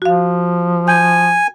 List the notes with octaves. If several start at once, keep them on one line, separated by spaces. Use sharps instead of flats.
F3 F#4 F5
G#5 G6